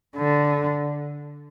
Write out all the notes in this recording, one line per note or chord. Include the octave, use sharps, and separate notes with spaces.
D3